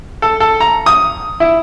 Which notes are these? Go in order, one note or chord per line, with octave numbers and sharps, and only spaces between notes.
A4
A4
A#5
D#6
E4